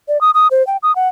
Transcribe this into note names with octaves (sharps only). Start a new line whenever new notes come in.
D5
D#6
D#6
C5
G5
D#6
F#5